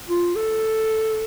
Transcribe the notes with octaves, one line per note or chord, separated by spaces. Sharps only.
F4
A4